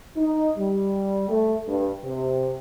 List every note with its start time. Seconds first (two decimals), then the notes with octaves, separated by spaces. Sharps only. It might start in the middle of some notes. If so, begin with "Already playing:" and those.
0.17 D#4
0.58 G3
1.29 A3
1.68 G2
2.03 C3